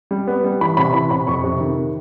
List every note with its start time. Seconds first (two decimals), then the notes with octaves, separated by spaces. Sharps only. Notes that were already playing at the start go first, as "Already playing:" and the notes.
0.11 G3
0.28 B3
0.44 G3
0.61 E3 B5
0.77 C3 B5
0.94 E3 B5
1.11 C3 B5
1.27 F2 C#6
1.44 C3
1.61 D#3